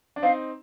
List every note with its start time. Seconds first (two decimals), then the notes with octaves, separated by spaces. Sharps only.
0.16 D4
0.23 C4 D#4 F5